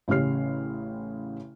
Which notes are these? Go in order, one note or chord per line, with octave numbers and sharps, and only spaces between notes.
A1 C#3 C#4 G4 F6 C7